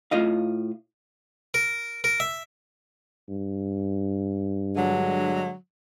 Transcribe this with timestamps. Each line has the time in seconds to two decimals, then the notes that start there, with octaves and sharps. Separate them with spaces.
0.11 A2 F4 D#5 F5
1.54 A#4
2.04 A#4
2.20 E5
3.29 G2
4.76 D3 F#3 G#3